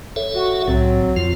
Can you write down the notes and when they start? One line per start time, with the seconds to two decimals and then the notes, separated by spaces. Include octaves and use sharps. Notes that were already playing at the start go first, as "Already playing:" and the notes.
0.16 A4 C#5 E5
0.35 F#4
0.68 C2 A2 F#3 C4
1.16 F2 F3 F4